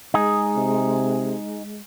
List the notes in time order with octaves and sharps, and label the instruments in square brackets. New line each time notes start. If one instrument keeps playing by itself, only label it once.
[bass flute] G#3 [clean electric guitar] D#4 G#4
[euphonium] C3